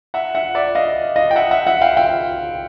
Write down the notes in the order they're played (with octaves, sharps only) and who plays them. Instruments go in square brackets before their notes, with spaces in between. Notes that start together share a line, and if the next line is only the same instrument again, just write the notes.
[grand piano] E5 F#5
E5 F#5
D5 E5
D#5 F5
D#5 F5
G5
E5 F#5
E5 F#5
E5 F#5
F5 G5
F5 G5